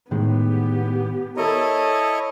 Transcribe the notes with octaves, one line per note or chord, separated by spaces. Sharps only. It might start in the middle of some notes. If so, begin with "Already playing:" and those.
A2 D#3 G#3 B3 G4
E4 A4 A#4 C#5 D#5